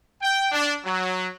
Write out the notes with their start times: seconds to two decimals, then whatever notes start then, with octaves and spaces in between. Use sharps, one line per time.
0.21 G5
0.52 D4
0.84 F#3